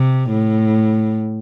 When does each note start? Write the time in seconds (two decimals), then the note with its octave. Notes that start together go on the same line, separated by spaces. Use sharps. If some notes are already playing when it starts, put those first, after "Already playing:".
Already playing: C3
0.31 A2